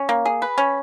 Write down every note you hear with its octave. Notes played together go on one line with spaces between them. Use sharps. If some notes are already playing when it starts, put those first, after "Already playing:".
Already playing: C#4
A#3
G#4
B4
C#4